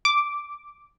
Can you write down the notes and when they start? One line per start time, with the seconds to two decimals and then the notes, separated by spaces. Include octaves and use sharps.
0.05 D6